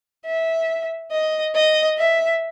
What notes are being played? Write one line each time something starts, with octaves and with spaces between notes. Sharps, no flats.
E5
D#5
D#5
E5